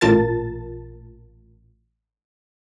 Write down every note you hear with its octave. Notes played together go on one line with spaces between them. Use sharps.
A1 A#2 F4 A#4 A5 A6